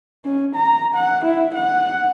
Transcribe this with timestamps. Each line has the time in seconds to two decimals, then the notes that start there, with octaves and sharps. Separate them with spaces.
0.25 C#4
0.55 A#5
0.95 F#5
1.25 E4
1.54 F#5